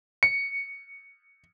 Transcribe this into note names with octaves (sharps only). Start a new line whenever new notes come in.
C#7